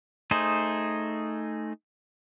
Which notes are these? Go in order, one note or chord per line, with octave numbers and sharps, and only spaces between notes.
A3 D#4 G#4 C5